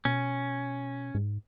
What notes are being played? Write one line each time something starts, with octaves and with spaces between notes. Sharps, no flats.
B2 C#4
G#2